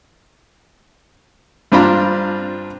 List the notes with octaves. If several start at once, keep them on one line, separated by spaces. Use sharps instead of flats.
G2 C4 D4 F4 A#5 B5